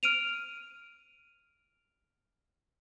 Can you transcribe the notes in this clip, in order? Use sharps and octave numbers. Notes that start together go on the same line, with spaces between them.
F6 D7 D#7 F7